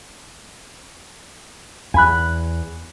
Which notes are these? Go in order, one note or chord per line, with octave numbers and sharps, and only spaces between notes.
E2 G#5 B5 F#6